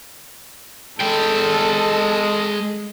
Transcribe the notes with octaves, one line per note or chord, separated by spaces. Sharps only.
G#3 A4 G5